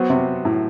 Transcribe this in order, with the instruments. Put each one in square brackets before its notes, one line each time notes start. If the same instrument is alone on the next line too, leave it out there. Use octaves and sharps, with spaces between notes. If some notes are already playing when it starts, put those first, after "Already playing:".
Already playing: [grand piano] F#3 B3 F#4 C5
[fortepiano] C3
A2